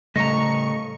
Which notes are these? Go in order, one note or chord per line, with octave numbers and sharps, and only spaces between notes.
A2 C#3 G3 A3 D#5 A#5 C#6